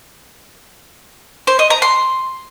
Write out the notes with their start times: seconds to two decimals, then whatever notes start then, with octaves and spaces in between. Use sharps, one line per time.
1.47 C5
1.59 D#5
1.70 A#5
1.82 C6